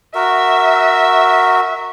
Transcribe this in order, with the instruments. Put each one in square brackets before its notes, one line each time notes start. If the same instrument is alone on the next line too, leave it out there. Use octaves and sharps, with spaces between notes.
[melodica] F#4 A#4 [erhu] E5